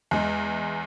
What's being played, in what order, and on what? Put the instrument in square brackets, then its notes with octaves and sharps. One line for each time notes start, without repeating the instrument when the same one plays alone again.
[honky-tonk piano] E2 G#3